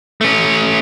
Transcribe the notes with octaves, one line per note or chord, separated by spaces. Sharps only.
A3 C#4